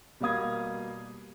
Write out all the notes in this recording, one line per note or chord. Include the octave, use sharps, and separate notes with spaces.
B2 G3 A#3 F5 D#6 G#6